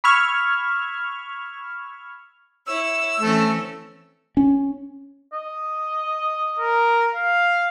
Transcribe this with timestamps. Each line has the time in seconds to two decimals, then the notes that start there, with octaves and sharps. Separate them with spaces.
0.04 B5 C#6 E6 F6 G#6
2.67 E4 C#5 E6
3.20 E3 A3 C4 C#4
4.37 C#4
5.33 D#5
6.59 A#4
7.15 F5